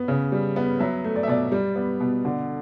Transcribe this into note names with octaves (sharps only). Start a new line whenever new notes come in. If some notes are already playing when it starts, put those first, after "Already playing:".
Already playing: B3
C#3
G3
B3
F#3 E5
A3
D5
E5
B2 D5
G3
B3
B2
D3